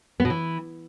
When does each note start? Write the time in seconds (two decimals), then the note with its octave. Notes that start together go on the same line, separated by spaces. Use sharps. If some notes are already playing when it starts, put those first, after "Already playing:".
0.20 B3
0.25 B2
0.30 E3